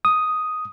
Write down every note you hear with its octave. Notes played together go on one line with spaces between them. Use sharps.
D#6